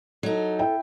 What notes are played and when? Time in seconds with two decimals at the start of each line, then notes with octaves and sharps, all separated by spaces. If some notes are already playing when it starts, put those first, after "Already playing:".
0.23 F#3 D#4 A4
0.59 E4 G5